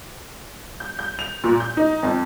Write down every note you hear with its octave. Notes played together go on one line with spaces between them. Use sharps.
G6
G6
F7
A#2
G6
D#4
F2